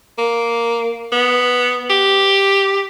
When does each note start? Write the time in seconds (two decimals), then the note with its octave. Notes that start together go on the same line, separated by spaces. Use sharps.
0.18 A#3
1.12 B3
1.90 G4